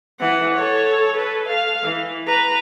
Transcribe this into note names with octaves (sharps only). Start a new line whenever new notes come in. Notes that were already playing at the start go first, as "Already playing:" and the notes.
E3 F#5
A4 C#5
A4 B4
F5
E3
B4 A#5